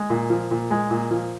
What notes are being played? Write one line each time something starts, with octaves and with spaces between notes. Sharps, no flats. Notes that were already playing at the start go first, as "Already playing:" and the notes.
Already playing: G#3
A#2
F3
A#2
G#3
A#2
F3